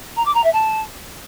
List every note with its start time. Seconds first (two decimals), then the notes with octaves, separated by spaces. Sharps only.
0.16 A#5
0.25 D6
0.34 A#5
0.43 E5
0.53 A5